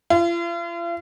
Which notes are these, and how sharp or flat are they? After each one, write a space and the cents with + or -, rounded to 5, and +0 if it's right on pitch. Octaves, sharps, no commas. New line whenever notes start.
F4 -40